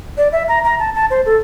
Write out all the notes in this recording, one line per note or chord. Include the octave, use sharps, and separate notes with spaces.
D5
E5
A#5
A#5
A5
A5
C5
A4